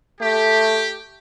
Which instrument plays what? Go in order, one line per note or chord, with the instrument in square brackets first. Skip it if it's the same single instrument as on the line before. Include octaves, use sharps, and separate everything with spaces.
[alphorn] A3 [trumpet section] G4